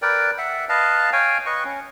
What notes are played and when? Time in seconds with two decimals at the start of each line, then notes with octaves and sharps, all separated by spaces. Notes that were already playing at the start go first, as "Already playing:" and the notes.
0.02 A#4 B4 D5 G5
0.38 E5 F#5
0.69 B4 D#5 F5 A5
1.13 C#5 F5 G5 G#5
1.46 B4 D#5 C#6
1.65 C#4